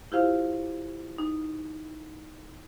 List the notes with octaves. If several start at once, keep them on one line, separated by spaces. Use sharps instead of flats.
E4 F4 G4 C5 F5
D#4